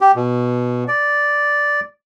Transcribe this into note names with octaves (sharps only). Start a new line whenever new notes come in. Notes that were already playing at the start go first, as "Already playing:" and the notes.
G4
B2
D5